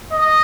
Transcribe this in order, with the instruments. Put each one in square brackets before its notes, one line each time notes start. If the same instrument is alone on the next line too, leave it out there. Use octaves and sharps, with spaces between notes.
[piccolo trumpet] D#5